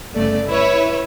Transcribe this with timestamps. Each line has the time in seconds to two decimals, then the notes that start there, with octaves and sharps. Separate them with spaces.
0.13 G1 C#3 A3 D5
0.47 E4 B4 C#5 E5